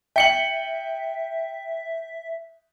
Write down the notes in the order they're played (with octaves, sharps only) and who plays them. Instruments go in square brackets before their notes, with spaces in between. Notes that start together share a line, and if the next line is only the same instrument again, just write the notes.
[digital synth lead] E5 [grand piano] G5 C#7 F#7